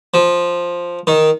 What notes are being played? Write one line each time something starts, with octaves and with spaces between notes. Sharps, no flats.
F3
D#3